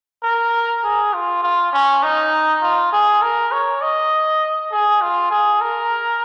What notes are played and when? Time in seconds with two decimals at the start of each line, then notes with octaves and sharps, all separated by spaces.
0.23 A#4
0.84 G#4
1.13 F4
1.43 F4
1.73 C#4
2.03 D#4
2.62 F4
2.92 G#4
3.22 A#4
3.52 C#5
3.81 D#5
4.71 G#4
5.01 F4
5.31 G#4
5.61 A#4